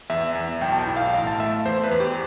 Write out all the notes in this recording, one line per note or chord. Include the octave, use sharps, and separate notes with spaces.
E2 E5
E2
B1 G5
A5
G5
E4
F5
A1 F5
A5
A3 E5
E2 C5
B4
E2
G4